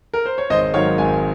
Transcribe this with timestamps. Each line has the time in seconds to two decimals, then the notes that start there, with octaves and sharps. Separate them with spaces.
0.14 A#4
0.26 C5
0.38 C#5
0.50 G#1 C5 D#5
0.74 G#2 D#3 F#3 C#5 F5
0.98 G#1 F5 G#5